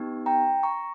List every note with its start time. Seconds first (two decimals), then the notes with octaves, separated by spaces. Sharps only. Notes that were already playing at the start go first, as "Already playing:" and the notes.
Already playing: B3 D#4 G4
0.26 G5 A#5
0.63 A#5 C#6